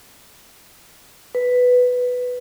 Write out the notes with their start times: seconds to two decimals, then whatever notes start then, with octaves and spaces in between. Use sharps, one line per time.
1.35 B4